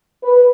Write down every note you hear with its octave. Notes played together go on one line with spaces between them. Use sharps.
B4